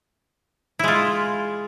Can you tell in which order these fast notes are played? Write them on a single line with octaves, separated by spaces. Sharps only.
E4 G#3 F4